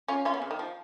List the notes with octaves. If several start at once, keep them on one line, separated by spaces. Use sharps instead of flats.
C#4 F4
C#4 F4
B3
C#3
D#3
F3